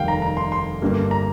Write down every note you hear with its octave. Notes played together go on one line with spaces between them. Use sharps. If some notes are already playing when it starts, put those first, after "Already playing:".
Already playing: F1 D#2 D#3 G3 F5 G5
A#5
A#5
C6
C6
G1 G2 G3 A#3
A#5